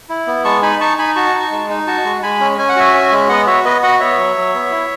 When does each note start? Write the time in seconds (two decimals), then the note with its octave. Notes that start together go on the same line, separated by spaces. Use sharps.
0.09 E4
0.27 B3
0.45 G#3 A5 C#6
0.62 D#4 G#5 B5
0.81 D#4 A5 C#6
0.98 D#4 G#5 B5
1.16 F#4 A5 C#6
1.34 D#4
1.51 G#3
1.69 D#4
1.87 F#4 A5 C#6
2.05 G#3
2.23 G#3 G#5 B5
2.40 C#4
2.58 C#4 G#5
2.69 F#5
2.76 F#4 E5 G#5
2.94 C#4
3.12 G#3
3.29 B3 D#5 F#5
3.47 F#4 C#5 E5
3.65 B3 B4 D#5
3.83 F#4 D#5 F#5
4.00 B3 C#5 E5
4.18 F#3
4.36 F#3
4.54 B3
4.71 E4